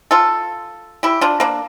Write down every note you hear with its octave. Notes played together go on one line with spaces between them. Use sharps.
F4 A4
E4 G4
D4 F4
A#3 D4